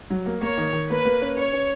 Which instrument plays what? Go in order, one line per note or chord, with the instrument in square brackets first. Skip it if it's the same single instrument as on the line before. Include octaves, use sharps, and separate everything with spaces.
[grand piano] F#3
A#3
[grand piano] A#3 [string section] C#5
[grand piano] D#3
D#3
[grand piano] A#3 [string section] B4
[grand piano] A#3
C#4
[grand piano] C#4 [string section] C#5
[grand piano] C#4